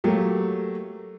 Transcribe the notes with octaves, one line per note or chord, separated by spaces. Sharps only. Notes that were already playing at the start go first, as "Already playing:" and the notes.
F#3 A3 A#3 G4